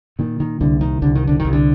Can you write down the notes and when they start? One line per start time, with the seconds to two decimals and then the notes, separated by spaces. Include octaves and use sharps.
0.19 A#2 D#3
0.40 D#3
0.60 C2 D3
0.81 D#3
1.02 C2 D3
1.15 D#3
1.27 D3
1.40 D#3
1.45 C2
1.53 D3